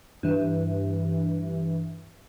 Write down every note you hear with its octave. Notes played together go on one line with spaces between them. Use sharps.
G2 E3